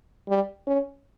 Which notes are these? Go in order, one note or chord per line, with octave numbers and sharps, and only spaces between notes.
G3
C#4